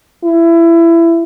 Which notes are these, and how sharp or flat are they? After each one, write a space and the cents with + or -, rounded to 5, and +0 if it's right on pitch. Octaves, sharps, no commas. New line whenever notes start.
E4 +20